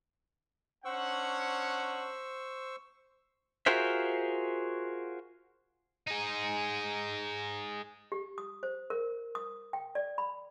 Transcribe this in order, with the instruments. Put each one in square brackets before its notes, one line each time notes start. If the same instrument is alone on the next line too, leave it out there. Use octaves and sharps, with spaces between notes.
[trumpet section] C#4 D4 F#5 [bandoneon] C5 C#6 E6
[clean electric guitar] F4 F#4 G#4 A#4 C5 E5
[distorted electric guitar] D#4 G#4
[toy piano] G4
D#6
C5
A#4
D#6
G5
D5
B5